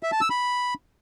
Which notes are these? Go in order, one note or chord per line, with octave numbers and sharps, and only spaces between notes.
E5
A5
E6
B5